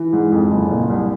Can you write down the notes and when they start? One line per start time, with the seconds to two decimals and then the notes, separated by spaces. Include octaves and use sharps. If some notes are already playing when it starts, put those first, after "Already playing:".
Already playing: E3
0.13 G#2
0.32 F2
0.51 F#1
0.70 A#2
0.90 C2